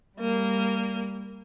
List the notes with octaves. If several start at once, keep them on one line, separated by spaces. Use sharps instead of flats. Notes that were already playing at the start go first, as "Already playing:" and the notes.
G3 A#3